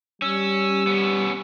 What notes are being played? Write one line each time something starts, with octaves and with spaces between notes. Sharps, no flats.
G3 C#4 E6
B3 C#4